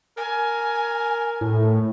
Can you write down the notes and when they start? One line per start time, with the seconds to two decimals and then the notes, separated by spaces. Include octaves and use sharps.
0.17 A#4 G#5
1.41 A2